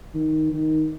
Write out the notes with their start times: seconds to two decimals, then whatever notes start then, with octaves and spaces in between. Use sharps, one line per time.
0.14 D#3
0.53 D#3